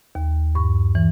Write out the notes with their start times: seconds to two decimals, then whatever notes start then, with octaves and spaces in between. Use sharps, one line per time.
0.15 D#2
0.55 G2 C#6
0.95 E3